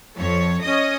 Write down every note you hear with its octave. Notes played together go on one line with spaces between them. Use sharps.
F2 A4 C#5
C#4 D#5 D#6 A#6